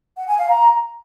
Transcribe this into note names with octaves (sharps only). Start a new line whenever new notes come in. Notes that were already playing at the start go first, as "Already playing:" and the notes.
F#5
G#5
F5
A#5